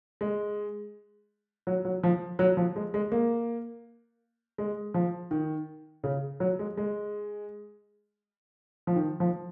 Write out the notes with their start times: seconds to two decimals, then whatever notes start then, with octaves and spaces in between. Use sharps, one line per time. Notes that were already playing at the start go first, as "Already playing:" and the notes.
0.21 G#3
1.67 F#3
1.85 F#3
2.03 F3
2.39 F#3
2.57 F3
2.76 G#3
2.94 G#3
3.12 A#3
4.58 G#3
4.94 F3
5.31 D#3
6.04 C#3
6.40 F#3
6.59 G#3
6.77 G#3
8.87 F3
8.96 D#3
9.20 F3